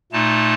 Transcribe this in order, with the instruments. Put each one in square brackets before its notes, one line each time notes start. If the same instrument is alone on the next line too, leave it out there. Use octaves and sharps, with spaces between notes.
[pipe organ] A#2 A3 D#4 A5